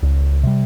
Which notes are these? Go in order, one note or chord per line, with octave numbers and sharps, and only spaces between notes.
C#2
C3 G3